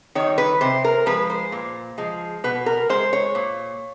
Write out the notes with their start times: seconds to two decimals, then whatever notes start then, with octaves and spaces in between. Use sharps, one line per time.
0.15 D#3 G3 C#5
0.38 B4
0.61 C3 C5
0.85 A#4
1.06 F3 G#3 B4
1.30 C5
1.52 A#2
1.98 F3 G#3
2.44 B2 B4
2.66 A#4
2.89 G#3 C5
3.13 C#5
3.35 A#2